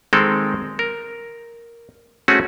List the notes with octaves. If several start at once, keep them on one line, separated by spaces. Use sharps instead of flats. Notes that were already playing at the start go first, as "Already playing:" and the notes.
D#3 G#3 C4 A4 A#4
A#4
A3 C4 C#4 F#4 G#4